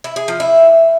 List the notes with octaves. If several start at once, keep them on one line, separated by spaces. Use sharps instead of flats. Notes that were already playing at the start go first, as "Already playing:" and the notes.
E4
G#4
F3
E4